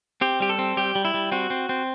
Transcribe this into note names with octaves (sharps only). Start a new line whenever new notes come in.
C4 G4
G3 G4
A4
C4
G3 G4
G3
E4
G3
C4 F#4
C4
C4